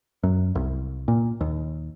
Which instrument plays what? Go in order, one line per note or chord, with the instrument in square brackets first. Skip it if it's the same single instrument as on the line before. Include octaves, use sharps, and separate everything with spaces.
[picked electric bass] F#2
C2
A#2
D#2